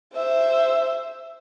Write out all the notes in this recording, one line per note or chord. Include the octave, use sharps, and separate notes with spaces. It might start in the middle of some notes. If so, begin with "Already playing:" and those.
C5 E5